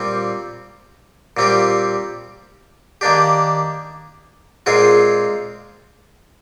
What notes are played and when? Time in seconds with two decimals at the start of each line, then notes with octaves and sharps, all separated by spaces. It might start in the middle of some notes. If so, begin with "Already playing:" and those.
Already playing: A#2 G3 C4
1.37 A#2 G3 C4 G4
3.01 D#3 A#3 D4 G4
4.66 A#2 G#3 C4 F4 G#4